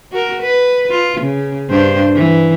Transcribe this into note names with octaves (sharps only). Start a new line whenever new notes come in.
F#4 A#4
B4
F4
C#3
G2 D4 C5
E3